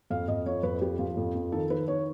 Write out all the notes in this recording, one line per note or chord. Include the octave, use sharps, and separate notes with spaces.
F2 F5
F2 D#5
F3 C#5
F2 B4
F3 G4
F3
F2
F3
D#3 A4
D#3 B4
D#3 C#5